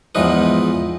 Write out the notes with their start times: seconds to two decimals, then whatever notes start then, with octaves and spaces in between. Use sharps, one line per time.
0.15 E2 G#2 F3 D#4 B4